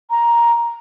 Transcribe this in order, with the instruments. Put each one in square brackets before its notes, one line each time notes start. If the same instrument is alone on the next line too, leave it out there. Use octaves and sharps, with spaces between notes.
[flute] A#5